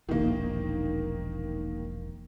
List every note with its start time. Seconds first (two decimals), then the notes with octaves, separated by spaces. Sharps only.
0.09 E1 A#1 D#3 A#3